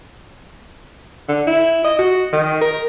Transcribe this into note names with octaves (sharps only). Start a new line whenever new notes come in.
D3
E4
D#5
F#4
D#3
A#4